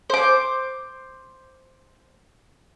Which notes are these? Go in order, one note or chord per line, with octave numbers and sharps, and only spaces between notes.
C5 D6